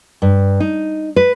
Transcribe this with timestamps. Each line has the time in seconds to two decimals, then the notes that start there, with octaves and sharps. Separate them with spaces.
0.22 G2
0.60 D#4
1.16 B4